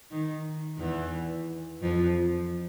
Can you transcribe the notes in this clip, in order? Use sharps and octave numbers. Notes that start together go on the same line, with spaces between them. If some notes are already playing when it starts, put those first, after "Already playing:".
D#3
E2 E3
F2 F3